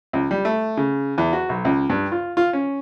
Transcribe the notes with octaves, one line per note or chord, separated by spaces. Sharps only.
C#2
G3
A3
C#3
E2
F#4
B1
C#2
G2
F4
F4
C#4